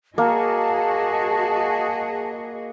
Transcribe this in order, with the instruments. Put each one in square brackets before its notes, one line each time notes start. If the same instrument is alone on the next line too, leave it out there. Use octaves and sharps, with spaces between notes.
[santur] A#3 [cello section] F#4 G#4 D#5 [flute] A5